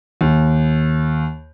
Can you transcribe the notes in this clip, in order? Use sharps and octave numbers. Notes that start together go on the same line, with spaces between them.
D#2